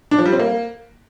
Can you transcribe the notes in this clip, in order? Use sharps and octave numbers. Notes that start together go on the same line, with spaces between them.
D4
F3
G3
C4
A#3